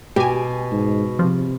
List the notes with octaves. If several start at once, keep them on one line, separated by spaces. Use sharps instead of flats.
B2 G4 G#5
G#2
C3 F3